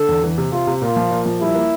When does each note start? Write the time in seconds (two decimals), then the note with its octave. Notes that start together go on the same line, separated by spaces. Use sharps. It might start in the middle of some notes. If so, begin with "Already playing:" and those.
Already playing: D3 A4
0.08 E2
0.23 E3
0.38 C3
0.52 C3 F4
0.67 C3
0.82 A#2 F4
0.96 F3
1.11 A#2
1.26 F3
1.41 G3 E4
1.55 A#3